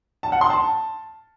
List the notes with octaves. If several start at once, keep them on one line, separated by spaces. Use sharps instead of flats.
A5
F#5
C6
A5